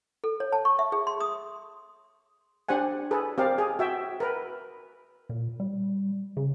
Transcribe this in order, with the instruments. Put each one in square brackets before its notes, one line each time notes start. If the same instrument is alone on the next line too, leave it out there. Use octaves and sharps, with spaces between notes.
[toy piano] A4
C#5
A5
C#6
E5
G#4
C6
D#6
[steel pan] D4 G4 C5 F#5 G#5
G#4 A4 B4
C4 G4 A#4 D5 F5
G#4
F#4 E5 G5
A#4 B4
[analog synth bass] A#2
G3
C#3